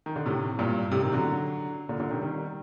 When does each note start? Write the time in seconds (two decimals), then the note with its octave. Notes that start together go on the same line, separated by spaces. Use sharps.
0.06 D#3
0.16 D3
0.26 A2 C3
0.59 G2 A#2
0.91 A2 C3
1.02 C3 D#3
1.13 D3 F#3
1.89 A#2 D3
2.00 A#2 D3
2.11 C3 D#3
2.22 D#3 G3